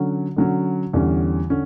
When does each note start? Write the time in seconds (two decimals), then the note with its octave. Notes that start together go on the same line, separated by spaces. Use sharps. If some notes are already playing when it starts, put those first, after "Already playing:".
Already playing: D3 F#3 C#4
0.36 D3 F#3 C#4
0.93 E2 D3 G3 C#4
1.50 D3 C#4